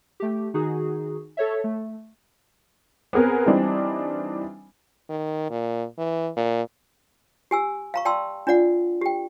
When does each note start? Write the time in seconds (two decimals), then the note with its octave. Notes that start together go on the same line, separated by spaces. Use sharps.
0.20 A3 G4
0.54 D#3 D#4 F#4 G#4
1.37 A4 C#5 E5
1.64 A3
3.13 B3 C4 G#4 A#4 B4
3.46 E3 G3 C4 D4 D#4
5.09 D#3
5.50 A#2
5.98 E3
6.37 A#2
7.51 G4 G#5 E6
7.94 F5 A#5 C#6
8.05 D5 G5 A5 C6 E6
8.47 D4 F4 D5 F#5
9.01 G4 G5